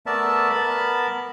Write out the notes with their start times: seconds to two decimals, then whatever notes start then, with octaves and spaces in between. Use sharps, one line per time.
0.06 A3 B3 A#4 D5 E5 A5
0.50 B3 A#4 A5 B5